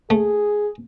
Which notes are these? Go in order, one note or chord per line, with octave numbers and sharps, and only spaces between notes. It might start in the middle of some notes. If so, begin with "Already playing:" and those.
A3 G#4